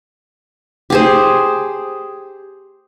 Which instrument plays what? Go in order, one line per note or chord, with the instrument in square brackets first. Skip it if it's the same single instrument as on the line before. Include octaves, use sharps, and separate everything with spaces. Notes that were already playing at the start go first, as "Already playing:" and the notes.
[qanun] G4 G#4 C5